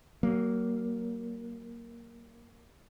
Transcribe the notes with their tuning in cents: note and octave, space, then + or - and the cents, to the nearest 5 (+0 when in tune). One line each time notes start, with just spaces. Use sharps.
F#3 +35 A#3 +0